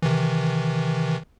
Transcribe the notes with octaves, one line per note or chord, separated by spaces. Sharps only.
C3 D#3 E3